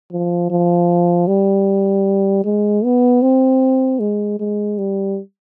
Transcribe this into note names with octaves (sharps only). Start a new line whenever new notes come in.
F3
F3
G3
G#3
B3
C4
G#3
G#3
G3